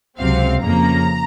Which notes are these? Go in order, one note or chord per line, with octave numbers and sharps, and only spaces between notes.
C#2 C3 F#3 C4 F5
F2 C#3 F3 A#3 A#5